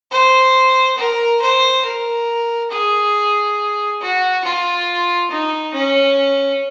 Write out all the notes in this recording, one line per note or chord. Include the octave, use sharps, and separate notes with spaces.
C5
A#4
C5
A#4
G#4
F#4
F4
D#4
C#4